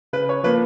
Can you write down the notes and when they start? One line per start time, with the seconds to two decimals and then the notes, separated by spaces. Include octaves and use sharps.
0.13 C#3 B4
0.29 C#5
0.43 F3 A#3 B4